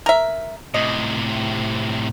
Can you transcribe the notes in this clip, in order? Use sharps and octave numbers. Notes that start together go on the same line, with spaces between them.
A#4 E5
A2 C3 D#5